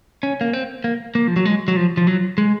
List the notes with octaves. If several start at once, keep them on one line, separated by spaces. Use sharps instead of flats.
C#4
A#3
C4
A#3
A#3
F3
F#3
G#3
F#3
F3
F3
F#3
G#3